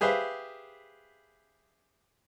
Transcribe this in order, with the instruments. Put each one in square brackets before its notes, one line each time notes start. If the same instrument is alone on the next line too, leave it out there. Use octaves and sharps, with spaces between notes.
[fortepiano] G4 G#4 B4 C5 E5 F5